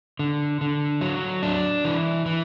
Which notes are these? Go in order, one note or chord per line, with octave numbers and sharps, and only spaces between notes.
D3
D3
F#3
D4
E3
E3